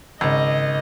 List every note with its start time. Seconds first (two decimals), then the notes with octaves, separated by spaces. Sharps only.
0.21 G#1 C#3 D#5 E6